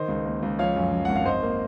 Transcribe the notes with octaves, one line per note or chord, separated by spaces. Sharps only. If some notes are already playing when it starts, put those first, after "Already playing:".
Already playing: D#3 C5 D#5
C#2
A#3
C#2
F3 C#5 F5
F#2
F#2
G#1 F#5
F5
G#1 C5 D#5
A#3